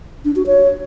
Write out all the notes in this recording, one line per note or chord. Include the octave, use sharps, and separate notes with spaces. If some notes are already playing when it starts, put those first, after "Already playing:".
D4
F#4
C#5